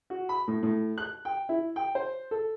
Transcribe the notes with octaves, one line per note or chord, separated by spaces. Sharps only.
F#4
B5
A2
A2
F#6
G5
E4
G5
C5
A4